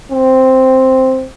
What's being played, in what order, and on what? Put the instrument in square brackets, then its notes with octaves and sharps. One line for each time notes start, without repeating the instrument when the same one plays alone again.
[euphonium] C4